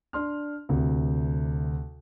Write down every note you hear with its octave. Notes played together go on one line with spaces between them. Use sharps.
D4 C6 F6
D2 C3